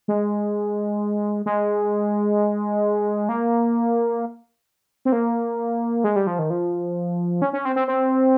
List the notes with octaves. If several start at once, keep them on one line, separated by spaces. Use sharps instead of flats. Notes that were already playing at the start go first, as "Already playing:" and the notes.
G#3
G#3
A#3
C4
A#3
G#3
G3
F3
D#3
F3
C#4
C#4
C4
C4
C4